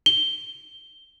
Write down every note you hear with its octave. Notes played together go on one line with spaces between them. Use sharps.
G7